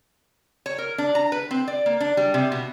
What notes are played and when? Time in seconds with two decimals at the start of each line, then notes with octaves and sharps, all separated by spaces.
0.66 C#5
0.78 A#4
0.98 D4
1.15 A#5
1.32 B4
1.51 C4
1.68 D5
1.86 A#3
2.00 D4
2.17 G3
2.34 C3
2.52 B2